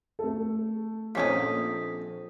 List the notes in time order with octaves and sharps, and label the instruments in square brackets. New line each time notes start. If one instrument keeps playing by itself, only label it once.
[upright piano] A3 A4
[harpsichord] A#1 F2 [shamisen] A#3 C#4 D#4 [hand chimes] D#6 B6